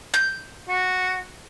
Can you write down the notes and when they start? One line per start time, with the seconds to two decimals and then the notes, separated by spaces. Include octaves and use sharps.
0.14 G6
0.69 F#4